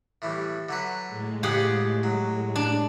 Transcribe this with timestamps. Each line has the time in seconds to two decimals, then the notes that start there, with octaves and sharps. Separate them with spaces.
0.22 A2 E3 G3
0.69 D3 F#3 B4
1.08 A2 G#3
1.43 C#3 F3 G4 G#4 F#5
2.03 F#3
2.56 D4